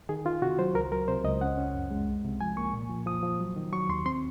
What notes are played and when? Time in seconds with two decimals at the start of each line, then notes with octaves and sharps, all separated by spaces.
0.09 D#3 G#4
0.25 D#3 F4
0.42 C3 F#4
0.59 F#3 C5
0.75 C#2 A#4
0.92 F#3 A#4
1.08 C3 C5
1.25 C#2 D#5
1.41 C#4 F#5
1.58 C#4
1.75 F#2
1.91 G#3
2.07 C2
2.25 C3
2.41 F3 G#5
2.57 A#3 C#6
2.73 A#2
2.90 F3
3.06 F3 D#6
3.23 F3
3.40 F#3
3.56 D#3
3.72 F#3 C#6
3.89 D#2 C6
4.06 C4 C6